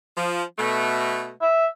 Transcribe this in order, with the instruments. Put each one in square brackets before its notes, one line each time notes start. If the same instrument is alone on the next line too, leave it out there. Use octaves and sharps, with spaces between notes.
[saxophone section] F3
B2 A3
[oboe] E5